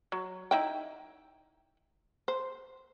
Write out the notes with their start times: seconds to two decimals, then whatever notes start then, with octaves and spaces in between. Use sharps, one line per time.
0.12 F#3
0.51 D#4 E4 G5
2.28 C5